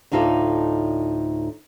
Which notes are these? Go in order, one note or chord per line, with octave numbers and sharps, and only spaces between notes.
D2 A2 D#4 F4 A4 D5